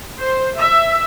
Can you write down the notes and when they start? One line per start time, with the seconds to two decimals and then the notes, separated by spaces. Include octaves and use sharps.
0.19 C5
0.57 E5